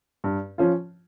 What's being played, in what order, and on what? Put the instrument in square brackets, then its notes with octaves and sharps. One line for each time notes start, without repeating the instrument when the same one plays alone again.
[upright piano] G2
F3 C#4 F4